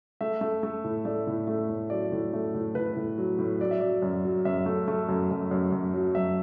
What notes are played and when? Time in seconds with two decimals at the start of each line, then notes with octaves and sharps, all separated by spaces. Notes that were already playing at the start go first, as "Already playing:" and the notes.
0.21 A3 E5
0.41 A3
0.63 A3
0.84 A2
1.05 A3 D5
1.27 A2
1.47 A3
1.70 A2
1.90 F#3 D5
2.12 A2
2.33 A3
2.54 A2
2.75 A2 B4
2.96 A2
3.18 F#3
3.39 A2
3.60 F#3 D5
3.71 E5
3.80 F#3 D5
4.02 F#2
4.25 F#3
4.45 F#2 E5
4.66 A3
4.88 A3
5.09 F#2
5.31 F#2
5.51 F#2
5.72 F#2
5.94 F#3
6.15 F#2 E5